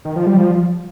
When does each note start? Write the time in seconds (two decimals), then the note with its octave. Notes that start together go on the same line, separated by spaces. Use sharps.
0.05 D#3
0.16 F3
0.26 G3
0.37 F3